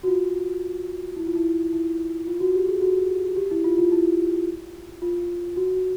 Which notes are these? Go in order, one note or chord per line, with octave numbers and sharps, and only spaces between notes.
F#4
F4
E4
F4
E4
E4
F4
F#4
G4
G#4
F#4
G4
E4
F4
F4
E4
F4
F#4
F#4